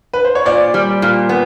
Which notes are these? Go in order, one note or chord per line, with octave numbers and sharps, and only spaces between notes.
B4
C5
C#5
A#2 C5 D5
G3
A#2
B3